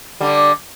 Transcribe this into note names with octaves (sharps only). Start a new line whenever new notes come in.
D3 G3